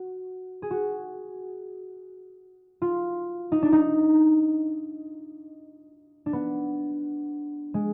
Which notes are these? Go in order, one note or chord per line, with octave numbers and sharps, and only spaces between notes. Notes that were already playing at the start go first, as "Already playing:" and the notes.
Already playing: F#4
G#4
F#4
F4
D#4
D4
D#4
D4
B3
G#3